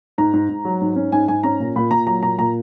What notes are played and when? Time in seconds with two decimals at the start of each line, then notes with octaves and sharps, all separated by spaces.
0.18 G#2 A#5
0.33 G#2
0.49 G#2
0.65 F#3
0.81 G#2
0.96 C#4
1.12 G#2 G#5
1.28 G#2 G#5
1.43 C#4 A#5
1.60 A#2
1.76 A#2 B5
1.91 A#2 A#5
2.07 F#3 A#5
2.23 A#2 A#5
2.38 A#2 A#5